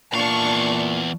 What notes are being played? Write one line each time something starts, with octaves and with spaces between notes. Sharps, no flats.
E2 A#2 D4 F5 C#6